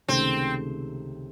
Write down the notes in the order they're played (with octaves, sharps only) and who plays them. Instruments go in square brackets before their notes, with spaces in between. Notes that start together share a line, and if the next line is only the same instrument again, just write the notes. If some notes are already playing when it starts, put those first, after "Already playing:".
[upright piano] C#2 C3 D#3 A3 [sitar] C4